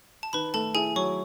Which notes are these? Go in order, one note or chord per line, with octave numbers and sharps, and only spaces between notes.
A5
D#3 B4 B5
A3 A4 A5
E4 G#4 G#5
F#3 C#5 C#6